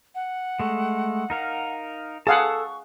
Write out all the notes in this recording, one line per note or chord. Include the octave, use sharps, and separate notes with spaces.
F#5
G#3 A3
D#4 A#4 F5
G#4 A4 F5 F#5 A5 C#6